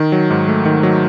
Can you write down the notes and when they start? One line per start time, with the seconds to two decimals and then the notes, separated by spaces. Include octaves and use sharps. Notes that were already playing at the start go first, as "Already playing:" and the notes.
Already playing: D#3
0.12 F#3
0.30 G#2
0.48 A3
0.65 D#3
0.83 F#3